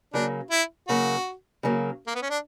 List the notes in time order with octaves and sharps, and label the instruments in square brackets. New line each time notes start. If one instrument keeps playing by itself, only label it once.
[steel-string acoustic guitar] C#3 F#3 A#3 [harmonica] D4
[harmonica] E4
[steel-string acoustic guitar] C#3 F#3 A#3 [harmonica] F#4
[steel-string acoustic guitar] C#3 F#3 A#3
[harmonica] A#3
B3
C#4
D4